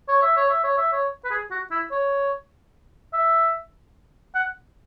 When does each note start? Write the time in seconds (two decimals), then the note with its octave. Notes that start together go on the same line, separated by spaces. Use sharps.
0.08 C#5
0.22 E5
0.36 C#5
0.50 E5
0.64 C#5
0.78 E5
0.92 C#5
1.24 B4
1.31 G#4
1.51 F#4
1.71 E4
1.91 C#5
3.13 E5
4.35 F#5